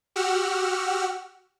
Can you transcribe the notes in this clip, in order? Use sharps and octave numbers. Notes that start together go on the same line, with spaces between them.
F#4 G4 F#5 E6 F6